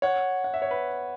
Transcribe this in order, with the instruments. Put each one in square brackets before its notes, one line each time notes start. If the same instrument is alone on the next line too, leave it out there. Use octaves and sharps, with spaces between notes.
[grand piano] C#5 F#5
F#5
E5
C#5
B4